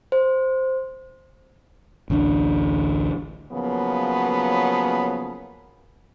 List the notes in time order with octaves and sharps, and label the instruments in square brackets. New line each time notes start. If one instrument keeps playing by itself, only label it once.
[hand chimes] C5
[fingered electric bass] A1 D2 C#4 D4
[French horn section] C#3 F3 F#3 A#3 B3